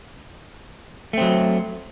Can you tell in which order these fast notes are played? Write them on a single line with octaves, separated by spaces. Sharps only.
A3 C4 F#3